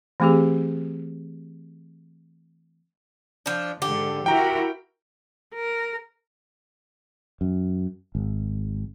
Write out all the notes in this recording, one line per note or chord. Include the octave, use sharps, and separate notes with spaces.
E3 A3 C4 G4 G#4
F3 D4
G#2 D3 G4 A4
E4 F#4 A#4 G5 A#5
A#4
F#2
G#1